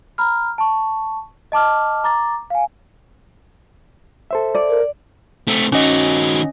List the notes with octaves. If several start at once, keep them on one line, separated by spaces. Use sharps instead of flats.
A#5 B5 F6
A5 C#6
D#5 A5 D6 F6
A#5 D6 A6
F5 G#5
A4 C5 E5
D5
A#4
A3 C4
D#3 C#4 F#4 D#5